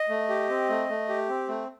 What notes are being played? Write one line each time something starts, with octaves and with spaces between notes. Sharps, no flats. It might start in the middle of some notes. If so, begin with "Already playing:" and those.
Already playing: D#5
A3
G4
C4
A3
A3
G4
C4
A3